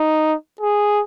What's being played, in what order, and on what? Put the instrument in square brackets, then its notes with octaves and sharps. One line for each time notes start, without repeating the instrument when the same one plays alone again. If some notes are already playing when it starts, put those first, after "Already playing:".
Already playing: [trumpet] D#4
G#4